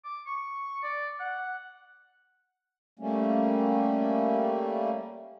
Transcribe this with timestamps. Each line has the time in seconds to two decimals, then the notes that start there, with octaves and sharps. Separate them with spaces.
0.05 D6
0.27 C#6
0.83 D5
1.20 F#5
2.99 G3 A3 A#3 C#4